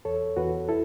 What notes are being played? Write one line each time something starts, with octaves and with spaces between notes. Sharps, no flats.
E2 A4 C#5
E2 F#4 B4
E4 A4